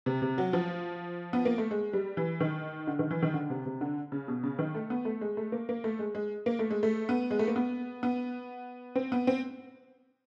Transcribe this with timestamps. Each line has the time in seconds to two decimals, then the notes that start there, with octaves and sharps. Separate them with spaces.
0.06 C3
0.22 C3
0.38 F#3
0.53 F3
1.33 B3
1.45 A#3
1.58 A3
1.71 G#3
1.93 G3
2.17 E3
2.40 D#3
2.87 D3
2.99 D#3
3.11 E3
3.23 D#3
3.34 D3
3.50 C3
3.66 C3
3.81 D3
4.12 C#3
4.28 B2
4.43 C#3
4.59 D#3
4.75 A3
4.90 B3
5.05 A3
5.21 G#3
5.37 A3
5.52 A#3
5.69 A#3
5.84 A3
5.99 G#3
6.15 G#3
6.46 A#3
6.59 A3
6.70 G#3
6.83 A3
7.09 B3
7.31 G#3
7.39 A3
7.47 A#3
7.56 B3
8.03 B3
8.96 C4
9.12 B3
9.27 C4